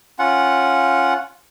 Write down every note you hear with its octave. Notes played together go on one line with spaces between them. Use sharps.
C#4 F4 F#5